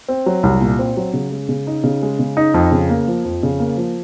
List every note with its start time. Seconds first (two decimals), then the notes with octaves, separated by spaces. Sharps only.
0.08 C4
0.26 F#3
0.43 C2
0.61 A#2
0.79 C4
0.97 F#3
1.13 C#3
1.32 G#3
1.49 C#3
1.67 D#4
1.84 C#3
2.02 G#3
2.19 C#3
2.37 D#4
2.54 F2
2.72 C#3
2.89 A#3
3.08 F3
3.25 F2
3.43 C#3
3.60 A#3
3.77 F3